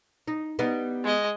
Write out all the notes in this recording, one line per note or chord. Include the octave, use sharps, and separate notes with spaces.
D#4
G3 B3 D#4
G#3 D#5